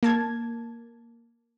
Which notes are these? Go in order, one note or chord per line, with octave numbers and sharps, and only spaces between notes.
A#3 A5 G#6